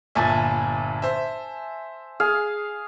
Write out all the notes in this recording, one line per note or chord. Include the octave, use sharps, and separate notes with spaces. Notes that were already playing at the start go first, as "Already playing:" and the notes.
G1 A#2 E5 G#5 A5
C5 E5
G#4 F5